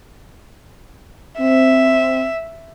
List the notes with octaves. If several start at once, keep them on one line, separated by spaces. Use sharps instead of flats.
C4 E5